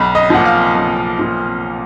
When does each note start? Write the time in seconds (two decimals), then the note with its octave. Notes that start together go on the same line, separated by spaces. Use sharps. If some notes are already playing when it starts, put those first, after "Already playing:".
Already playing: B1 B5
0.15 D#5
0.30 A#2 F3 F#5
0.45 F5
0.75 B1
1.19 A#2 F3